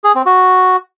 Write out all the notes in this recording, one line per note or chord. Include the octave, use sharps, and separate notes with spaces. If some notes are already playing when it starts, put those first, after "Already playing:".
G#4
C4
F#4